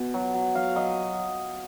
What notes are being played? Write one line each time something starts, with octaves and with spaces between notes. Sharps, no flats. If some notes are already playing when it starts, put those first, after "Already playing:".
Already playing: B2
F#3
F#3
F#3 F5
F#3 D#5